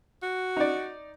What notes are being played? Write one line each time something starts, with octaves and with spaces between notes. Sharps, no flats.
F#4
D#4 D5